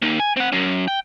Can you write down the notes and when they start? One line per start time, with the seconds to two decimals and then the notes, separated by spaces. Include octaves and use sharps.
0.02 A#3 D#4
0.20 G#5
0.37 C4 F#5
0.52 F#3 C#4
0.88 G5